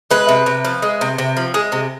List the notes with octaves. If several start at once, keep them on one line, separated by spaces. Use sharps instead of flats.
G#3 B4
C3
C3
F3
G#3
C3
C3
F3
G#3
C3